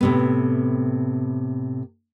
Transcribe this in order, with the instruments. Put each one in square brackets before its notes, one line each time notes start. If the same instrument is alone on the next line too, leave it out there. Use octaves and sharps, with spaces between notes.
[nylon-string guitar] A2 C3 B3